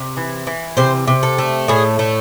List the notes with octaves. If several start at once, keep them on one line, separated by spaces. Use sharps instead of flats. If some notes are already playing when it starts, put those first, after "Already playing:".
Already playing: C3
E3
E3
C3 C5
C3
A4
A3
A2 G#4
A3